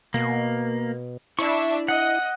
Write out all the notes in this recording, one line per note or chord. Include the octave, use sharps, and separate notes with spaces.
B2 A#3
D4 E4 E5 C#6
D#5 F#5